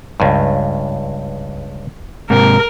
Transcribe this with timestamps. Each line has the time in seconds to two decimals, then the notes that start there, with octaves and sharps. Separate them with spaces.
0.20 C#2 G2
2.30 G#2 C3 A#4